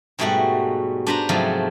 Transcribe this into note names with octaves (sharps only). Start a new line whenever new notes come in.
G#2 B2 G3 A3 F#4 F#5
D4 B4 C5 A#5
G#2 C3 F3 F#3 A3